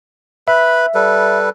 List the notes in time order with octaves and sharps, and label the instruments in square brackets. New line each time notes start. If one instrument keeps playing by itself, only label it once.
[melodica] B4 B5 [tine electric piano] E5
[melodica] G3 A4 B4